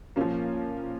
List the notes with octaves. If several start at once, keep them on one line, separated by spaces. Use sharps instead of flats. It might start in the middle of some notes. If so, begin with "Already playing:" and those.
A#2 F3 A#3 C#4